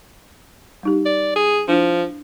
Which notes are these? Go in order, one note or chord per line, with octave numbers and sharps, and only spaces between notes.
G3 D#4 G4
D5
G#4
F3 D4 E4